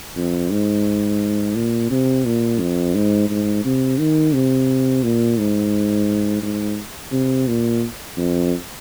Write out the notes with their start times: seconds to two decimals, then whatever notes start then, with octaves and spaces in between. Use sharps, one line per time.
0.16 F2
0.52 G#2
1.56 A#2
1.91 C3
2.26 A#2
2.60 F2
2.95 G#2
3.30 G#2
3.65 C3
3.99 D#3
4.34 C3
5.04 A#2
5.38 G#2
6.42 G#2
7.12 C3
7.48 A#2
8.17 F2